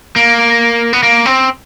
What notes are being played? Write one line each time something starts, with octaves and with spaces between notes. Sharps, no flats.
A#3
B3
A#3
C4